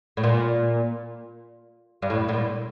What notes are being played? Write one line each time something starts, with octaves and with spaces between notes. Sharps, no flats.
A2
A#2
G2
A2
A2
A#2